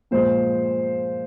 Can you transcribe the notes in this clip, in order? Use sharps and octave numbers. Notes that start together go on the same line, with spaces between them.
A#2 F3 G#3 C5